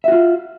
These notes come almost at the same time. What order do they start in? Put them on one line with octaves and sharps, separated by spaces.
E5 F#4 F4